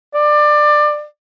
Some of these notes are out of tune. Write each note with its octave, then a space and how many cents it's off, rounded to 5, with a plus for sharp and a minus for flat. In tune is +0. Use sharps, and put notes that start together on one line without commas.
D5 +20